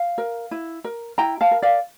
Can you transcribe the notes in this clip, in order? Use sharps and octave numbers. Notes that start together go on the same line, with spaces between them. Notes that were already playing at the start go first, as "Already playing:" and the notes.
Already playing: F5
A#4
E4
A#4
E4 G5 A#5
F5 A5
A#4
D5 F5